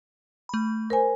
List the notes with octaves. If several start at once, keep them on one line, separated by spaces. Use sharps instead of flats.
A3 B5
A#4 C5 G#5